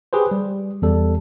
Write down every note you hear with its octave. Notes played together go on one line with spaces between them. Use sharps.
G4 G#4 B4 C5
G3
E2 G3 A4